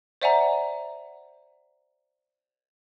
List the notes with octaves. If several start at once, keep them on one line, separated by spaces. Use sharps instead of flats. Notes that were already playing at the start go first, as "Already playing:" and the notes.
C5 D5 E5 F#5 G#5 A#5